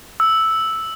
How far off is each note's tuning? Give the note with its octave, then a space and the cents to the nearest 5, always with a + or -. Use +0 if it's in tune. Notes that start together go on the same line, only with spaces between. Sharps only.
E6 -5